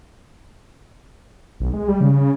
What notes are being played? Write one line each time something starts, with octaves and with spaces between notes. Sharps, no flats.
B1
G#3
G3
C#3
C#3